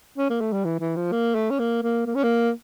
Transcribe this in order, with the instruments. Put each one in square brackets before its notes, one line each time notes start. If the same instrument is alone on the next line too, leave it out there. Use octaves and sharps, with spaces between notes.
[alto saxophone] C#4
A#3
A3
G3
E3
E3
F3
A#3
A3
C#4
A#3
A#3
A#3
C#4
A#3